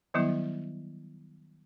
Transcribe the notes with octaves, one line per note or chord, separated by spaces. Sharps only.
D#3 F#3 G3 B3 E4